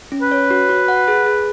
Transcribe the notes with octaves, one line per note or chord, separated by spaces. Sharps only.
C#4
B4
C#5
F#4
F#4
F#5
G#4
G#4